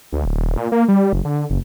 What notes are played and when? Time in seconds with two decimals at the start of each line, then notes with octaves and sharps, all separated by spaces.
0.13 D2
0.25 D1
0.37 D#1
0.57 A#2
0.72 A#3
0.88 G3
1.13 F#1
1.25 D3
1.50 F#1